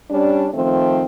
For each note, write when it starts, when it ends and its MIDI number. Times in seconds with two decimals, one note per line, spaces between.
0.10 0.47 55
0.10 0.47 61
0.10 0.47 62
0.53 1.04 51
0.53 1.04 53
0.53 1.04 57
0.53 1.04 60